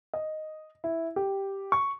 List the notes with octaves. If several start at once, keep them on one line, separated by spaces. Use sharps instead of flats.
D#5
E4
G4
C#6